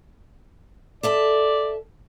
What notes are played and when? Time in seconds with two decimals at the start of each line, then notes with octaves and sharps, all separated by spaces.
1.03 A4 D5 E5 A5